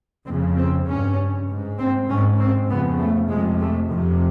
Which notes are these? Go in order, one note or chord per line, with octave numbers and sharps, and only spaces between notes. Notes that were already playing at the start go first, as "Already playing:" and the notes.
F2 C#3 C4
C4
G2 C#4
G#2
C4
G#2 C#4
C4
F2 C#3 B3
A3
F2 C3 G#3
A3
F2 C3 D#3